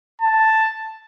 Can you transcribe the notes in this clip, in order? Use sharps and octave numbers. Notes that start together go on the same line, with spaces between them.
A5